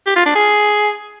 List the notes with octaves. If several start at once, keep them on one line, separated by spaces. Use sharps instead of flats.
G4
F4
D4
G#4